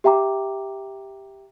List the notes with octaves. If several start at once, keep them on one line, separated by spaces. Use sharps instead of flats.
G4 E5 G5 A#5 D6